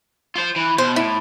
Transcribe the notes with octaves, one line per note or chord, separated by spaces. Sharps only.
F4 C5
E3
B2 C5
A2 E4